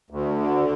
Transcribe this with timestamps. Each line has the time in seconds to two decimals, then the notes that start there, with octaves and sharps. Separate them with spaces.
0.10 D2
0.40 D3